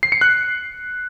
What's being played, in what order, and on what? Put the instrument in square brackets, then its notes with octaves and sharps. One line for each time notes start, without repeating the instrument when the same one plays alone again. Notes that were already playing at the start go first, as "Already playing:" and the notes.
[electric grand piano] C7
C#7
F#6